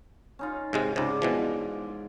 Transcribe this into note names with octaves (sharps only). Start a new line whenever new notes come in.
C#4 D#4 F4
G#2 C3 G#3
C#2 G#2 C3 D5 G#5
B2 E3 F3